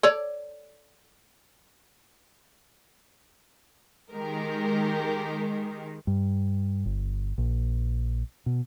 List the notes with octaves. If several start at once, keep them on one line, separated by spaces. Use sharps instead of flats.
A4 C#5 D5
D#3 G#3 G4 A#4
G2
G1
A#1
B2